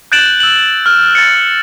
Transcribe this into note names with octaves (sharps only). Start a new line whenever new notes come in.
F#6 G6 A6 D7 E7 F#7
E6 F#7
F6
A6 C#7